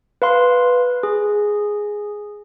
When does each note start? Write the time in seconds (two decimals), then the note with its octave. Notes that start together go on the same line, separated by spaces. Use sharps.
0.22 B4 F5 C6
1.03 G#4